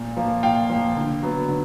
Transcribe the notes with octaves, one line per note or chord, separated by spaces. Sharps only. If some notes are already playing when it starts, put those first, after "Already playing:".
Already playing: A#2
F3 A#3
A#2 F5 G5
F3 A#3
D3
F#3 B3
D3